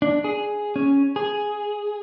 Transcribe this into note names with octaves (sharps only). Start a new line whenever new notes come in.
D4
G#4
C#4
G#4